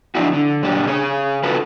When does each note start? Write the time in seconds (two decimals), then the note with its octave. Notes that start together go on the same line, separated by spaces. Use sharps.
0.15 D3 F3 D4 E4 F#4
0.33 D3
0.63 F#2 A#2 D4 G4
0.85 C#3 G#4 C#5
1.43 F4 F#4 A4 B4